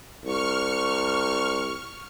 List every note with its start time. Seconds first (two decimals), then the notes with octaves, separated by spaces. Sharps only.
0.24 C2 C#6 F6